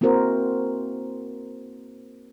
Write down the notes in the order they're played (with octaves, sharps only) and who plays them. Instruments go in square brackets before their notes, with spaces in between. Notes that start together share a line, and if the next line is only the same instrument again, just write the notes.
[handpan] A#3 C4 E4 F#4 A#4 C5